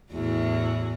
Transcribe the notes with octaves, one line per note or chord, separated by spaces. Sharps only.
E2 A2 F#4